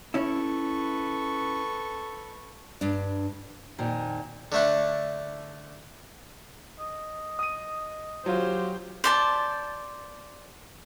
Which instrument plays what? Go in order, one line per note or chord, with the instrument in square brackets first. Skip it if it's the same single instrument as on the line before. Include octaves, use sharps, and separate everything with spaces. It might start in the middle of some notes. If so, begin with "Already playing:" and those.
[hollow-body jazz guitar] C#4 E4 [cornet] A4 [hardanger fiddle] B4 C#6
[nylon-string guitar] G2 D4
F2 A#2 D#3
[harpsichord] D3 A3 D4
[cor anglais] D#5
[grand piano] D#6 D#7
[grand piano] F#3 F4 [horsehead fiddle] G4 C5
[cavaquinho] C5 D5 A5